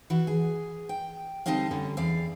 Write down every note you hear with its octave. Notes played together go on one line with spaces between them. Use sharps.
E3 E4 F#4
G#4
G5
D3 G3 C4 D#4 D#5 F5
D3 G3 C#4
E2 D5 F5